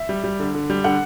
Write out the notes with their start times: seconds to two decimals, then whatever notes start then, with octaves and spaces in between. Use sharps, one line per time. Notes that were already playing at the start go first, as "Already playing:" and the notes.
Already playing: E5
0.09 G3
0.24 G3
0.40 D3
0.55 D3
0.70 G3
0.84 D3 F#5